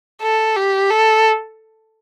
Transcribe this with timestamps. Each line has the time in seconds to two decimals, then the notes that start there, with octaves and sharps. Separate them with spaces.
0.22 A4
0.57 G4
0.91 A4